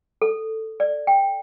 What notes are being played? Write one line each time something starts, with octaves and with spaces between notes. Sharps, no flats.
A4
D5
G5